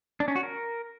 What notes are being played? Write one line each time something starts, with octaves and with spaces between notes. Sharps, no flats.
D4
C#4
F#4
A#4